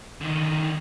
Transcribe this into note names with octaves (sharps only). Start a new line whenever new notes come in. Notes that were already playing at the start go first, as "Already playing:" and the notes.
D3 D#3